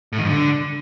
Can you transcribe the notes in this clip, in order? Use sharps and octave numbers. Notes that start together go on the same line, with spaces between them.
A2
D#3
G2
D3